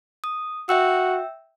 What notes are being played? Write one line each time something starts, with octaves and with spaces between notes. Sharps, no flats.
D#6
F#4 E5 G5 E6